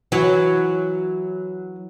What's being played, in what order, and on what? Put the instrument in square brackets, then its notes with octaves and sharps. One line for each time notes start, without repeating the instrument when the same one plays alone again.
[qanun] E3 E4 C#5 [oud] F#3